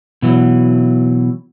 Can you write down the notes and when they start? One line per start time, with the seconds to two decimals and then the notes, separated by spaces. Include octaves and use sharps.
0.22 B2 E3 F#3